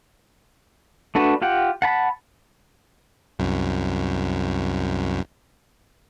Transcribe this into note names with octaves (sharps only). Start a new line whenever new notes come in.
A3 D4 F#4 B4
F4 G4 F#5 G5
F#5 A5 B5
C2 F#2